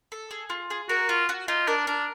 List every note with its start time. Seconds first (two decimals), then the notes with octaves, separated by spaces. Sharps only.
0.12 A4
0.31 G#4
0.50 F4
0.70 G#4
0.89 F#4 A#4
1.09 F4 F#4
1.29 F#4
1.48 D#4 F4
1.67 D4 A#4
1.87 D4 A#4